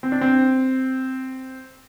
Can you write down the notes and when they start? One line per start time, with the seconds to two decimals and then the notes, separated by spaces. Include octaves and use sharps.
0.03 C4
0.12 D4
0.21 C4